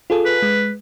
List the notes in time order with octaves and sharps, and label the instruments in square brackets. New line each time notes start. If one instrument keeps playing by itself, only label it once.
[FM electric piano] F4 G#4 A4
[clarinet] B4
[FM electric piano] G#3